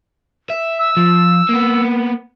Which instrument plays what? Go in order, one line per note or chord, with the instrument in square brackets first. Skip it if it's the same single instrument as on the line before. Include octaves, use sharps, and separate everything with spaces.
[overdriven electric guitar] E5
[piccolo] E6
[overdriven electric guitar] F3
A#3 B3